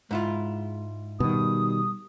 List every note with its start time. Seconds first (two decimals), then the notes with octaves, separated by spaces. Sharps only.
0.11 G#2 G#3 E4 F4
1.20 B2 D#3 G3 D#6